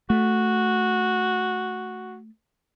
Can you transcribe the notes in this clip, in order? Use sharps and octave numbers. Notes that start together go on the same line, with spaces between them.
A3 F#4